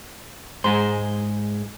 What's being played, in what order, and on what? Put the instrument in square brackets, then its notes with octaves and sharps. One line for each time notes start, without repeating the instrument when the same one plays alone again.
[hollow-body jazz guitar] G#2 [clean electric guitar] G#3 G#4 C5